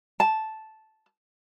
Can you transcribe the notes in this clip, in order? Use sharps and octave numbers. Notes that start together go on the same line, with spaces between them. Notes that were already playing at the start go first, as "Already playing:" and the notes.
A5